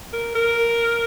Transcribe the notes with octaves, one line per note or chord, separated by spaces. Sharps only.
A#4
A#4